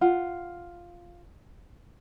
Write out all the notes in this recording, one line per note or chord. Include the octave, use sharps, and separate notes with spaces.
F4 F#5